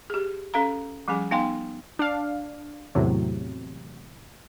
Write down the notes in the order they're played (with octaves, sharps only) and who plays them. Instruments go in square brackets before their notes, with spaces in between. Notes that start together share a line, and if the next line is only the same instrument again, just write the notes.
[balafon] G4 G#4
C#4 A4 F5 A#5
F3 G3 C#4 G#4 G#5
B3 D#4 F5 G5 G#5 C6
[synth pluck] D4 F5
E2 A2 C3 F#3